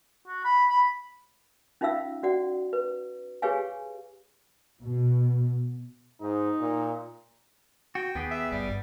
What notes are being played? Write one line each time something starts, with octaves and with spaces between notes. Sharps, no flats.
F#4
B5
B5
C#4 D#4 F4 E5 F5 E6
C#4 F#4 D5 F#5
B4
G4 G#4 B4 C#5 F5 G#5
B2
G#2 D#4
A#2
F#4 G5
D#2 B3 G4 G#4
E5
G1 G3
G2